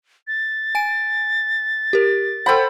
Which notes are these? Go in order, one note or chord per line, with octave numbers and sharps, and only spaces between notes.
A6
G#5 D7
G4 A#4
A4 C5 F#5 G5 B5